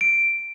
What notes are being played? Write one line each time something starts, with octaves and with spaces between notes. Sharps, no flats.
D7